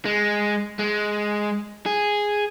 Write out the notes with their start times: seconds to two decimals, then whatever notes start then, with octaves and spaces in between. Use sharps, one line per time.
0.05 G#3
0.79 G#3
1.86 G#4